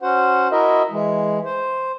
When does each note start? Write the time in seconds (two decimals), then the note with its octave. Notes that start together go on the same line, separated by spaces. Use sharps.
0.01 C#4 F#4 C5 F#5
0.52 E4 F#4 A#4 D#5 E5
0.91 E3 G#3
1.46 C5